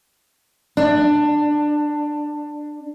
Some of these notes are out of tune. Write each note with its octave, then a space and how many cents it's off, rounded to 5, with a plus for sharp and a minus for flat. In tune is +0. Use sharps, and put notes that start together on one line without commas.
D4 +15